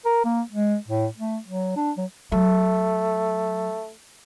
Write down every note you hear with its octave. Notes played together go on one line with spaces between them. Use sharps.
A#4
A#3
G#3
A2
A3
F#3
D4
F#3
F#3 A3